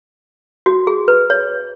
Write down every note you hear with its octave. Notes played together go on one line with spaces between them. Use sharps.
F#4
G#4
B4
C#5